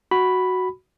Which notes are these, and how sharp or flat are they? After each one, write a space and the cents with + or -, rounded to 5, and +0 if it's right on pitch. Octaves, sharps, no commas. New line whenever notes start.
F#4 +0 B5 +0